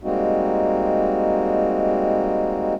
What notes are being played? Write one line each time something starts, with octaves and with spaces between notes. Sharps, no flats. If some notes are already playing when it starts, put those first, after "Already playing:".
G3 G#3 A#3 C4 D#4 F#4